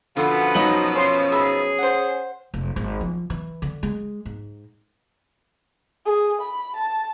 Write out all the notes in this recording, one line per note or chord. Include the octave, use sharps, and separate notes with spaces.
F#2 B2 D3 F3 B3 F4 A4 F#5
F#3 D#4 F#7
C#4 C6
D#4 G#4 E5 B5
C5 F#5
F1
G#1
F3
E3
D3
G#3
G#2
G#4
B5
A5